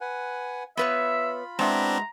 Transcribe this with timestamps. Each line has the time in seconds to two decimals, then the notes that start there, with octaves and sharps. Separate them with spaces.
0.01 B4 F#5 G#5
0.77 B3 F4 B4 C#5 E5 B5
1.59 G#3 B3 C4 D4 E4 F#4 E5 A#5